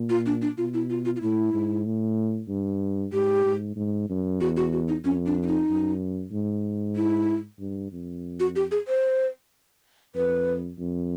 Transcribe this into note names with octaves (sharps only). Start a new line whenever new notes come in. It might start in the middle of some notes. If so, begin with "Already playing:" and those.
Already playing: A#2
F4
D4
D4
B2 F4
E4
F4
F4
F4
A2 E4
G#2
A2
G2
G#2 G4
G#2
G#2
F#2
E2 F#4
F#4
F#4
D#4
F2 C#4
D4
D4
D#4
F#2
G#2
E4
G2
F2
F#4
G4
G#4
C5
F2 B4
F2